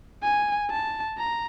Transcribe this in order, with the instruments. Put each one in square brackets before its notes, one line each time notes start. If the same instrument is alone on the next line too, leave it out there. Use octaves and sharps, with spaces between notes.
[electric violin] G#5
A5
A#5